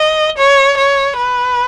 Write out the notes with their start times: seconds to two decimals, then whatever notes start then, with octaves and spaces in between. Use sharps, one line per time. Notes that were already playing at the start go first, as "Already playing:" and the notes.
Already playing: D#5
0.38 C#5
0.77 C#5
1.17 B4